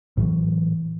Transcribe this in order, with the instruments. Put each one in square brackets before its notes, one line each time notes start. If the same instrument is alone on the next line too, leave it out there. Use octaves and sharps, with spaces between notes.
[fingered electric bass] A2 E3 F#3